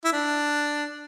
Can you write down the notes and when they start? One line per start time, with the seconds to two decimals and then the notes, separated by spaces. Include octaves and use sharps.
0.05 E4
0.13 D4